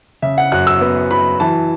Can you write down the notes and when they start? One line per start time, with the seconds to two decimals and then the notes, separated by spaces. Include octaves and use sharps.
0.22 C#3 E5
0.38 F#5
0.52 F#2 F#6
0.67 E6
0.81 B3
1.11 F#3 B5
1.40 E3 A5